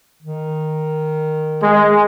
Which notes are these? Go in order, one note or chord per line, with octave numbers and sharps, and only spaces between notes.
D#3
G#3